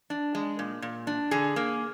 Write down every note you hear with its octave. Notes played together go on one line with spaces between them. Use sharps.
D4
G#3
A#2
A#2
D4
D3 G#4
A#3